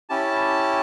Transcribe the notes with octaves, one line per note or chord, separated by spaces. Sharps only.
C#4 E4 G4 A5